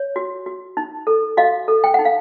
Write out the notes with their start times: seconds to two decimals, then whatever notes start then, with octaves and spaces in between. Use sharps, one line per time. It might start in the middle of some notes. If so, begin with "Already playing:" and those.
Already playing: C#5
0.16 F#4
0.46 F#4
0.77 D#4
1.07 A4
1.37 F#4 D#5 F5
1.68 A4
1.84 G5
1.94 D#4 F#5
2.05 F5